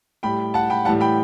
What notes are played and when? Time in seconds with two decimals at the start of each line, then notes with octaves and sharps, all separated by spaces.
0.23 A2 G3 G5 B5
0.54 F#5 A5
0.70 G5 B5
0.85 A2 E3 G3 F#5 A5
1.01 G5 B5